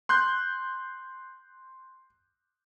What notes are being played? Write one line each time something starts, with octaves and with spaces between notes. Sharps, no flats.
C6 F#6 G6